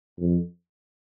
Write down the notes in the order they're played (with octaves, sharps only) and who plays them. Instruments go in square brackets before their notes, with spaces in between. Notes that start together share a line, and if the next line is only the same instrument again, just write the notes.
[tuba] F2